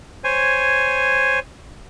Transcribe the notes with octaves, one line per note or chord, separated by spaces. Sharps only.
C5 C#5 G#5